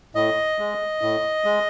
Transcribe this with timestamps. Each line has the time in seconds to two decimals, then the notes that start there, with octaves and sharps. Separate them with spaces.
0.15 A2 D#5
0.59 G#3
1.02 A2
1.44 G#3